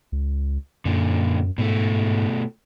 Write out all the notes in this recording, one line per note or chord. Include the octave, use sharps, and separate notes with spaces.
C#2
F#2 A#2 D3
G#2 B2 A3